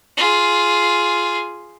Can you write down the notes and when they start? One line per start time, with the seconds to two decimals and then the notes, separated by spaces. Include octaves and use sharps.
0.17 F4 G#4